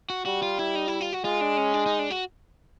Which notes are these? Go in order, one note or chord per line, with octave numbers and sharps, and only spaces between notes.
F#4
G3 F#4
F4
E4
D#4
E4
F4
F#4
G#3 F4
D4
C#4
D4
D#4
D4
F#4